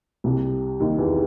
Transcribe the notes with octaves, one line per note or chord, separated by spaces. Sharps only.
C2 C3
D#2 D#3
E2 E3